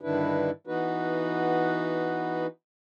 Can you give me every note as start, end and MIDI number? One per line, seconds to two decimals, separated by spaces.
0.01 0.50 43
0.01 0.50 50
0.01 0.50 51
0.01 0.50 62
0.01 0.50 64
0.01 0.50 71
0.67 2.46 52
0.67 2.46 59
0.67 2.46 63
0.67 2.46 66
0.67 2.46 71